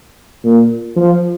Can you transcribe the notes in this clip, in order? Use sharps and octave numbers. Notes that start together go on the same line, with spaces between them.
A#2
F3